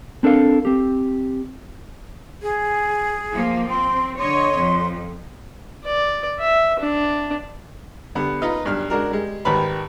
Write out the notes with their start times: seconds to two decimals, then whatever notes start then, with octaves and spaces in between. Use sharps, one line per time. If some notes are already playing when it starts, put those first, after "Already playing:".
0.23 C4 D4 A4 A#4 F5
0.65 C4 G4
2.42 G#4
3.34 F3 A#3
3.70 C4 C6
4.18 D3 C#5 D#5 C6
4.56 F2
5.85 D5
6.40 E5
6.79 D4
8.15 D3 G3 B3
8.42 D#4 F4 B4 D#5
8.65 B1 G2 D4 F6
8.90 G#3 D4 F#4 A#4
9.11 G3 G#3
9.45 G#1 D#3 G3 B4 B5